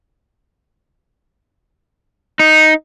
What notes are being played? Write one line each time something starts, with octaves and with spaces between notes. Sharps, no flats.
D#4